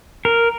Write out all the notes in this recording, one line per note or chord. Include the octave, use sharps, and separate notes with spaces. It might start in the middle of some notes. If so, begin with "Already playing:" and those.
A#4